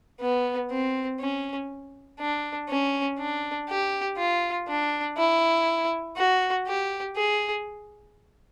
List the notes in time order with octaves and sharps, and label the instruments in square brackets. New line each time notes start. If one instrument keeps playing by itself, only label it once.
[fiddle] B3
C4
C#4
D4
C#4
D4
G4
F4
D4
E4
F#4
G4
G#4